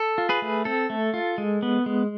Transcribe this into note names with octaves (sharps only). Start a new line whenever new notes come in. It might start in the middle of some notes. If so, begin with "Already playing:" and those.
Already playing: A4
F4
G#4 B4
A3
C4 A4
A3
F4
G#3
B3
G#3